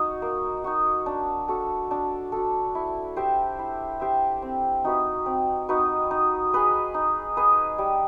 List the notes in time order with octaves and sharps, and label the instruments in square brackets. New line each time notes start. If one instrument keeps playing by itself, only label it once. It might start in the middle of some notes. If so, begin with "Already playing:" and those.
Already playing: [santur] D#4 F#4
A#3
D#4 F#4
D4
F#4 A4
D4
F#4 A4
E4
G4 C5 E5
E4
G4 C5 E5
C4
D#4 F#4 B4
C4
D#4 F#4 B4
D#4
G#4 B4 D#5
D#4
G#4 B4 D#5
G3